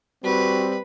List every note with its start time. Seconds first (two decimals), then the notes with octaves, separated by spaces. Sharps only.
0.24 G3 C4 F#4 B4